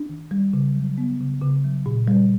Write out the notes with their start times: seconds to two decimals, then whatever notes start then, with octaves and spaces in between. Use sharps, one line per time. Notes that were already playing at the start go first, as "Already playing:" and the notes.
Already playing: D4
0.09 D#3
0.31 G3
0.53 C#3
0.75 F#3
0.98 B3
1.20 C#3
1.42 C#3
1.64 F#3
1.86 A#2
2.08 G3